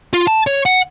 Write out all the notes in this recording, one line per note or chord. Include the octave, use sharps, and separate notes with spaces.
F4
A5
C#5
F#5